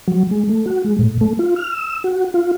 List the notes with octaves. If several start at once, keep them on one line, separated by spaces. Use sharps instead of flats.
F#3
G#3
A3
F#4
G#3
A2
A3
F4
F6
E6
F#4
F4